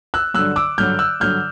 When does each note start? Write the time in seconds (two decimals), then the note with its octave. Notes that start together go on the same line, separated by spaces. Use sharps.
0.14 E6 F#6
0.34 G2 D3 F#3 E6 F#6
0.56 D6 E6
0.78 G2 D3 F#3 F6 G6
0.99 E6 F#6
1.20 G2 D3 F#3 F6 G6